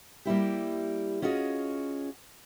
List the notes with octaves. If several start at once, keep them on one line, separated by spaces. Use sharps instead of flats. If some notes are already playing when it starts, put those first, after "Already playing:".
G3 A#3 E4 G4
C#4 F4 F#4 G#4 D#5